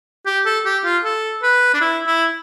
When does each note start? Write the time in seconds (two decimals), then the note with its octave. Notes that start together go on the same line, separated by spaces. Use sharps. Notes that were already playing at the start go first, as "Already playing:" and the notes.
0.26 G4
0.46 A4
0.65 G4
0.84 F4
1.04 A4
1.43 B4
1.74 D4
1.81 E4
2.07 E4